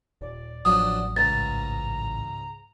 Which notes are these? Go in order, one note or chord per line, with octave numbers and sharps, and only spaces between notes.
D#1 D5
A1 F3 F#3 D4 D#6
C#2 G#2 A#5 A6